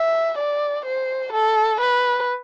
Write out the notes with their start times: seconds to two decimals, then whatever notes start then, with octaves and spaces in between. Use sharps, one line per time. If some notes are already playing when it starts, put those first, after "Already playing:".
Already playing: E5
0.38 D5
0.85 C5
1.33 A4
1.81 B4